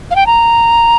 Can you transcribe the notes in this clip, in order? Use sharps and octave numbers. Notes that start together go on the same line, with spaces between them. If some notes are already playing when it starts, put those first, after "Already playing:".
F5
G5
A#5